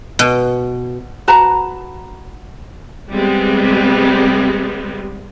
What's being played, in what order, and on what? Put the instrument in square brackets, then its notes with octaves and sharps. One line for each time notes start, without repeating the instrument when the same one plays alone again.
[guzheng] B2
[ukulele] F#4 B4 A5 A#5
[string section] C3 G3 G#3 B3 C4